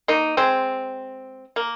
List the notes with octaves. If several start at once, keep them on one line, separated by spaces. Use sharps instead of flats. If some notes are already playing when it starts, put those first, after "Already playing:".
A#3 D#4
G#3 C4
A#3